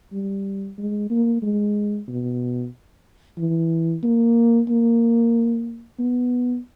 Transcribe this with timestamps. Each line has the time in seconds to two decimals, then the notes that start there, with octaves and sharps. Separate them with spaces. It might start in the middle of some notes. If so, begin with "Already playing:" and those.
0.12 G3
0.78 G#3
1.10 A#3
1.42 G#3
2.08 B2
3.38 E3
4.03 A#3
4.69 A#3
5.99 B3